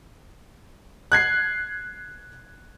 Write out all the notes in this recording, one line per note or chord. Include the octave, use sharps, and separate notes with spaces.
F#6 G#6 C7